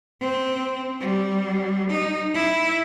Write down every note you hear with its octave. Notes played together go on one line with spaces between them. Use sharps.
C4
G3
D#4
E4